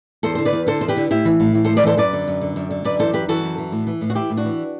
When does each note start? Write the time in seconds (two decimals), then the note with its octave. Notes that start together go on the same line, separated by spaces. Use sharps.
0.23 E2 A4 C5
0.35 D3 C5
0.45 B4 D5
0.53 E2
0.67 D3 A4 C5
0.81 E2 C5
0.88 G4 B4
0.97 D3
1.11 A2 E4 G4
1.25 E3
1.40 A2
1.55 E3
1.65 A4 C5
1.69 A2
1.76 B4 D5
1.84 E3 A4 C5
1.98 F#2 B4 D5
2.13 D3
2.28 F#2
2.41 D3
2.56 F#2
2.70 D3
2.85 F#2 B4 D5
2.99 E3 A4 C5
3.13 F#2 G4 B4
3.29 E3 F#4 A4
3.43 F#2
3.58 E3
3.72 A2
3.87 E3
4.01 A2
4.10 F#4
4.15 E3 E4 G4
4.30 A2
4.37 D4 F#4
4.45 E3